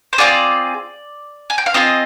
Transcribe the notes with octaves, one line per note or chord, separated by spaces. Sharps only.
C5
C4 F4 G#4 D5
G#5
G5
F5
C4 F4 G#4 D#5